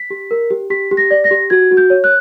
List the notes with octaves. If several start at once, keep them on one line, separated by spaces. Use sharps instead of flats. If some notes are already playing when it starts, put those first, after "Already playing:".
Already playing: B6
G4
A#4
G4
G4 B6
G4
A#6
D5
A#6
G4
F#4 G#6
F#4
G6
C#5
F#6